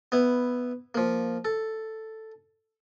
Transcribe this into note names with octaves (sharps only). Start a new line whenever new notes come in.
B3 E4
F3 A#3
A4